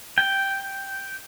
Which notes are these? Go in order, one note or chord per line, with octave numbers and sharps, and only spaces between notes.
G5